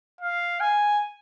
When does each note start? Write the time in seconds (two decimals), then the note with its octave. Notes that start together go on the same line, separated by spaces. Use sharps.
0.21 F5
0.60 G#5